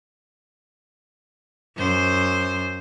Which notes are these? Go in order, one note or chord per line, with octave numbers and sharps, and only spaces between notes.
F#2 C5